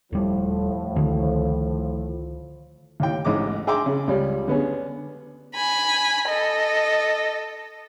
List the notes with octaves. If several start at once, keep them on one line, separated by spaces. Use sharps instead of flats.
D#1 A2 F3 G3
C#2 D3 D#3
D#2 A2 G5
A1 G#2 D#5 A#5 D6
G#4 E5 G5 A#5 C6 D6
C#3
C#2 G3 C#4
D3 B3 C#4 G#4
G#5 B5
A4 D#5